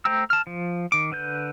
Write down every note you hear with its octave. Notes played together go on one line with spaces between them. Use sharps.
A3 C5 G5 A#5 E6
A5 F6
F3
D#3 D6
D3 B4 G6